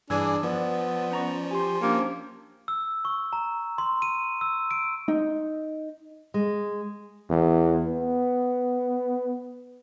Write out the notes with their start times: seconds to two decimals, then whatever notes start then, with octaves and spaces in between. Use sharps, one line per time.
0.10 G2 E3 D4 G#4 G#5 E6 G#6
0.43 F3 B3 D5
1.12 C#4 A#5 C#6
1.51 G4 G#5 C6
1.82 A#3 C#4 D4 G4 C5
2.68 E6
3.05 C#6
3.33 A#5
3.78 C6
4.02 D#7
4.41 E6
4.71 D7
5.08 D#4
6.34 G#3
7.29 E2
7.87 B3